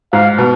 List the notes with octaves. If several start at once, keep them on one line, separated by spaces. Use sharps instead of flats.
G#2 F5
B2